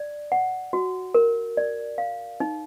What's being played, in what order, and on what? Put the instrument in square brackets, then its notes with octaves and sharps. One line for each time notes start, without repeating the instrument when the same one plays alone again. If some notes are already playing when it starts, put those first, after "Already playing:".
Already playing: [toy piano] D5
F#5
F#4
A#4
D5
F5
D#4